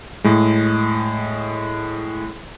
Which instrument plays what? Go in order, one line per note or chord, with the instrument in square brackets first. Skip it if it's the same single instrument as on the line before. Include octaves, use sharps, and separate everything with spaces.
[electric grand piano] A2 G#3